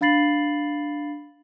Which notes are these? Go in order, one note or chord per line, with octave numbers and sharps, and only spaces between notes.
D4 F5 B5 A6 C7 F#7